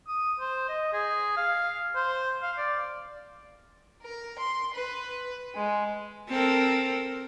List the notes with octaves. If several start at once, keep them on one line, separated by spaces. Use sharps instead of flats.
D#6
C5
D#5
G#4
F5
C5
F5
D5
A#4
C6
B4
G#3
C4 A4 A#4